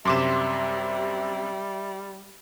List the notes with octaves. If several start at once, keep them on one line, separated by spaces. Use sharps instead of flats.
F#2 C3 G3 E5 C6 D6 E7